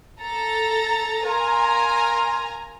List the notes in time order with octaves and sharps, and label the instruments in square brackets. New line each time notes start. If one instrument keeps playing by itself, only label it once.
[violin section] A4 A#5 A6
[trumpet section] A#4 F5 C6 [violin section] G#5 A#5